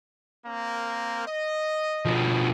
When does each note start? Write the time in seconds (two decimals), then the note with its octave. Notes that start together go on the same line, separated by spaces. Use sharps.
0.46 A#3 C4 A#4
1.27 D#5
2.06 B2 F3